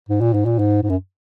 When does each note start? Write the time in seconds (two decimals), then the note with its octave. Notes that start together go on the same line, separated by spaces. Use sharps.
0.09 G#2
0.21 A#2
0.33 G#2
0.45 A#2
0.59 G#2
0.83 G#2
0.89 F#2